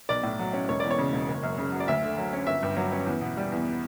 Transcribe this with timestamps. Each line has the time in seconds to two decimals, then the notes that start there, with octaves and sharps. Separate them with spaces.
0.09 B1 D5
0.23 A2
0.39 F#3
0.53 C#4
0.69 E1 C#5
0.80 E2 D5
0.91 C#5
0.98 C#3
1.13 E1
1.28 F#1
1.43 F#2
1.58 C#3
1.72 F#3
1.80 D5
1.88 D2 E5
2.03 D3
2.18 F#3
2.33 C#4
2.47 G1 E5
2.63 G2
2.77 F#3
2.92 C#4
3.07 E2
3.21 B2
3.37 G3
3.52 E2